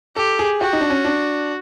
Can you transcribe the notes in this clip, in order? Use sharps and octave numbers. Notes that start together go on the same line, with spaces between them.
G4 A4
G#4
F#4 G4
D#4
D4
C#4
D4